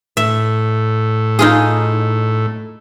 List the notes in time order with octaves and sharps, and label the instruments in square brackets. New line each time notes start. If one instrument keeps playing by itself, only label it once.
[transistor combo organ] A2 [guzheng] E5
[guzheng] D#4 F4 G#4